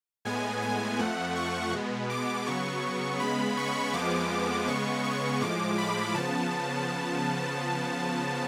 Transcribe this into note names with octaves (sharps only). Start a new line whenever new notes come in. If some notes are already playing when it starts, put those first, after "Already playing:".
A2 G#3 B3 G#5
G#5
F2 F3 A3 F#5
C#6
B2 G#3 B3
D6
C#3 F#3 B3 C#6
C#3 G#3 B3 B5
C#6
F2 F3 G#3 B3 D6
C#3 G#3 B3 C#6
C#6
A2 F3 G#3 D6
B5
C#3 F3 B3 A5